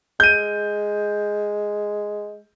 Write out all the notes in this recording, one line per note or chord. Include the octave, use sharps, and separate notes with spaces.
G#3 G6 D#7